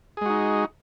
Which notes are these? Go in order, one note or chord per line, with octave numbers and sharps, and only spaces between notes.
G#3 D#4 F#4 G#4